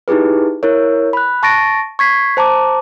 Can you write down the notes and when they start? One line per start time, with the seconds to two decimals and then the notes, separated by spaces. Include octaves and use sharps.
0.08 D#4 E4 G4 G#4 B4
0.63 E4 A#4 C#5
1.13 B5 F#6
1.43 A5 C#6 A6 A#6 D7
1.99 C#6 G#6 B6 C7
2.37 C5 A5 A#5 D6